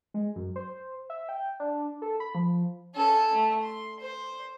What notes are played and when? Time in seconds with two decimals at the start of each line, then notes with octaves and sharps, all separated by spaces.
0.14 G#3
0.36 F#2
0.56 C5
1.10 E5
1.29 G5
1.60 D4
2.02 A4
2.20 B5
2.35 F3
2.95 C#4 A4
3.33 A3
3.63 C6
4.00 C5